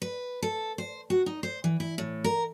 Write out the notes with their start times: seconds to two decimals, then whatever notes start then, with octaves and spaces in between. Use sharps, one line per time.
0.02 B4
0.42 A4
0.78 C5
1.10 F#4
1.26 D#4
1.43 C5
1.64 E3
1.80 E4
1.98 A2
2.24 A#4